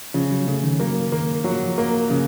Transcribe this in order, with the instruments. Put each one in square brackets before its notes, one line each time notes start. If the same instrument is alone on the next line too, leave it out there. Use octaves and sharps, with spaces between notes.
[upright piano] C#3 [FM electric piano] F3
[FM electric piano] F#3
[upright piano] C#3 [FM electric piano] A3
[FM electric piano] D#3
[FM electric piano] F#3 [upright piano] A#3
[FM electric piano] D#3 [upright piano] A#3
[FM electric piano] F3 [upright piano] F#3
[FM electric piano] F3
[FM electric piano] F#3 [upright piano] A#3
[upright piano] C#3 [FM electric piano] F3